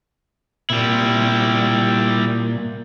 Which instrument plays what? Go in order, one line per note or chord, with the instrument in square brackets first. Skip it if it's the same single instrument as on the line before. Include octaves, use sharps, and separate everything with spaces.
[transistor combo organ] A#2 [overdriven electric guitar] G3 E4